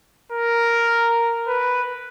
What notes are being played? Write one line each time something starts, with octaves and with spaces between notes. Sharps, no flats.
A#4
B4